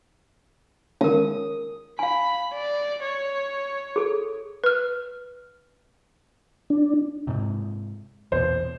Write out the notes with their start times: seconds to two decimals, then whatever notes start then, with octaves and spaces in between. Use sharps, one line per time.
1.01 D#3 G#3 C#4 F4 A#4 D#6
1.99 F5 G#5 B5
2.53 D5
3.03 C#5
3.96 G#4 A4
4.64 B4 F6
6.70 D4
7.27 G#2 C3
8.32 A#1 E2 B2 C5